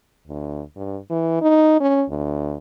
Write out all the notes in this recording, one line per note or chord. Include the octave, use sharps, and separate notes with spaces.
D2
G2
E3
D#4
C#4
D2